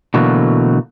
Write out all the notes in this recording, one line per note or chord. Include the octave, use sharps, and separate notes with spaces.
B2 D3 E3 F#3 A3 A#3